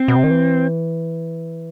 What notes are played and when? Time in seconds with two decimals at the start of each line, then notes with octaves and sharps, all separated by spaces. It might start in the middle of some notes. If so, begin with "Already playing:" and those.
Already playing: C4
0.08 B2
0.16 C3
0.24 D#3
0.30 E3